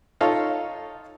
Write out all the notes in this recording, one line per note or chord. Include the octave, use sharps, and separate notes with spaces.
D#4 F4 A4 C#5 F5